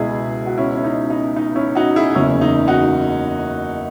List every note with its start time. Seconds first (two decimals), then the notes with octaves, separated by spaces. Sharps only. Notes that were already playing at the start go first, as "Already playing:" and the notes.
Already playing: C#2 B2 G#3 E4 G#4
0.46 F#4
0.58 C#4 E4
0.77 C#4
0.84 D#4
1.10 D#4
1.36 D#4
1.56 C#4 E4
1.75 D#4 F#4
1.96 E4 G#4
2.15 F#1 E2 C#3 C#4 E4
2.41 D#4
2.68 D#4 F#4